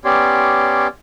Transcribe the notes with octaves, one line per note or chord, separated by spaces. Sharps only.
B3 C#4 G4 C#5 D5 C6